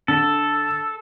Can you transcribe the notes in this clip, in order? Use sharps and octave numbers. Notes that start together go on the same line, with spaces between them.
D3 A4